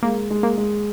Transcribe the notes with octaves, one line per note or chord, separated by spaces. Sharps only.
G#3 A#3
G#3
A#3
G#3